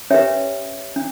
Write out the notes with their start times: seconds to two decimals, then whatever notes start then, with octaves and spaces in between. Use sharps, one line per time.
0.10 C#4 G4 B4 C#5 E5
0.96 C#4